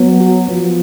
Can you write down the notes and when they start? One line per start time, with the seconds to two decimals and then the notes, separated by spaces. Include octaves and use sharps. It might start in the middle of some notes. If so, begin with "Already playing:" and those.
Already playing: F#3 B3
0.21 F#4
0.48 F3 B3